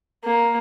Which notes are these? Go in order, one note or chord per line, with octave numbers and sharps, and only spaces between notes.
A#3